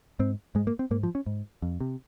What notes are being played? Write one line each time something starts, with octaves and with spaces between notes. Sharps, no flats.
G#2 C4
G#2 G#3
A#3
C4
G#2 A#3
F3
C#4
G#2
F2
C3